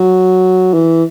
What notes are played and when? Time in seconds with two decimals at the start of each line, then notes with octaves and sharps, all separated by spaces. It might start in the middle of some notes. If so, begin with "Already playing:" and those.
Already playing: F#3
0.74 E3